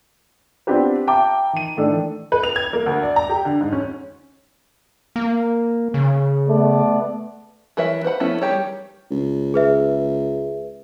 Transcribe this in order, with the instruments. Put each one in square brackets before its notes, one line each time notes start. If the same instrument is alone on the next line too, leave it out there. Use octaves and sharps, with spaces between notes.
[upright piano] B3 C4 D4 F4 G4 B4
E5 G5 A5 A#5 D6
D#3 D#7
A2 D#3 E3 D4 A4
[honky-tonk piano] B4
F7
G#6
A#3
D2
D5
A#5
G4
D3
G#2
C#4
[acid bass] A#3
C#3
[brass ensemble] A3 B3 D5
[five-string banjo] E3 A#4 B4 C#5 E5
B4 C5 F#5 B5
F3 A3 B3 C#4 E4
D#3 F3 G3 G4 C#5
[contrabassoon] C#2
[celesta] G#4 B4 E5